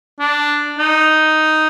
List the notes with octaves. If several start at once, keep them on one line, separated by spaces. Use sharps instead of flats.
D4
D#4